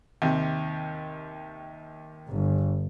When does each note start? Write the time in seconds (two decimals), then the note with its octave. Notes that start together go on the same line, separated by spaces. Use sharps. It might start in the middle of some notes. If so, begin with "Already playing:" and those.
0.22 D#2 C3
2.29 G1